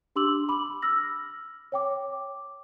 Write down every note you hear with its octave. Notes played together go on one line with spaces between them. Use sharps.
D4 G4 C6 D6 E6 F#7
B5 D6 F#7
E6 F6 A#6
C#5 G5 D6